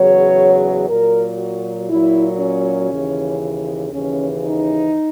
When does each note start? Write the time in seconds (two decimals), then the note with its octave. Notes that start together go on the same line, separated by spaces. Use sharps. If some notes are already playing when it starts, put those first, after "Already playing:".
Already playing: E2 C#3 F#3 C#5
0.87 A#2 F#3 A#4
1.38 F#4
1.89 A#2 F#3 E4
2.40 C#4
2.91 D#2 C#3 E3
3.93 D#2 C#3 E3 C#4
4.44 D#4